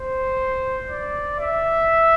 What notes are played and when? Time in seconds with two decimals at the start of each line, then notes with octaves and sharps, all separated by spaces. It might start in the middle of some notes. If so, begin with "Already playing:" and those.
Already playing: C5
0.90 D5
1.40 E5